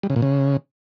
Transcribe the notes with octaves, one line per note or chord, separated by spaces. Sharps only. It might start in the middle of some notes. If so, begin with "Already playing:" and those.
G3
C#3
A#2
C#3